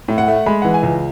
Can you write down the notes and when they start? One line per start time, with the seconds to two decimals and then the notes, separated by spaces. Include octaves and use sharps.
0.08 A2
0.18 F#5
0.28 A3
0.46 G#3 B5
0.62 E3 F#5
0.74 G#5
0.83 C#2